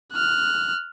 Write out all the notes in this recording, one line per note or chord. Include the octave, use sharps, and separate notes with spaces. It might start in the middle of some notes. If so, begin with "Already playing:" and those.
F6 F#6